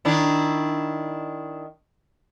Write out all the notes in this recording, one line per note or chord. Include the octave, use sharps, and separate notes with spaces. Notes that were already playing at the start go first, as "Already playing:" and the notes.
D#3 D4 E4